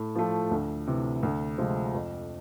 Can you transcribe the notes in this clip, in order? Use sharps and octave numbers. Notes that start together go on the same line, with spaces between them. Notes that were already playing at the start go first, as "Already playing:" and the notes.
Already playing: A2
F3 A3
D2
C3 E3
D2
C3 F3 G#3 C4
F2